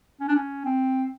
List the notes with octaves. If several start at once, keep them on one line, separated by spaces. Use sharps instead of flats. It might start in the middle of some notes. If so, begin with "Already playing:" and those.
C#4
D4
C#4
C4